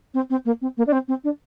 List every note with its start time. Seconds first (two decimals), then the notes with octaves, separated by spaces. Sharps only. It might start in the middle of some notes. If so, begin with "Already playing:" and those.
0.14 C4
0.30 C4
0.45 A#3
0.61 C4
0.77 A#3
0.87 D4
0.92 C4
1.08 C4
1.24 D4